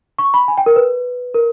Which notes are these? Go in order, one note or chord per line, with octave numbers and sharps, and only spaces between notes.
C#6
B5
G#5
G5
A#4
B4
A#4